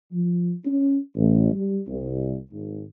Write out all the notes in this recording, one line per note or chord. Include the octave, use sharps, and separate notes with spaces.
F3
C#4
A1
G3
C2
G#1